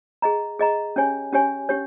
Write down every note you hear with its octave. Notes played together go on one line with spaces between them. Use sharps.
G#4 D#5 A#5
G#4 D#5 A#5
C#4 G4 C#5 G#5
C#4 G4 C#5 G#5
C#4 G4 C#5